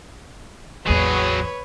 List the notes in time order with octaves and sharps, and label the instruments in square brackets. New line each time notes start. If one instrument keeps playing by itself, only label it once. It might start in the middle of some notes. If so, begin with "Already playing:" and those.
[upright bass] A1 E2 [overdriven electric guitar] F#3 G#4 [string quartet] B4 C#5